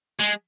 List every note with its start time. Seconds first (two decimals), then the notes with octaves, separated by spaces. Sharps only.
0.21 G#3